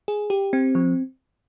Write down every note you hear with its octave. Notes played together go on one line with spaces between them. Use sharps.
G#4
G4
C4
F3